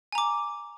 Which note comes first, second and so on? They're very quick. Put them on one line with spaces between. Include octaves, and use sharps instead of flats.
G#5 A#5 D6